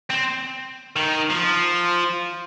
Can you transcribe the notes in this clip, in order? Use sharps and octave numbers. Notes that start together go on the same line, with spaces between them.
C4
D#3
F3